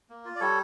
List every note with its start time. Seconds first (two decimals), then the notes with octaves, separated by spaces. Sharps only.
0.10 A#3
0.25 F4
0.35 D5
0.40 G3 A4 C#5